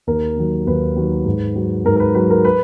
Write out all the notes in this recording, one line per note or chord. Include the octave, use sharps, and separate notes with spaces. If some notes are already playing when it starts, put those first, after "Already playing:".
D#2 A#4
D#3 F#3
D#2 B4
D#3 F#3
G#2
F#3
G#2 A#4
A#4
B4
F#3 B4
A#4
B4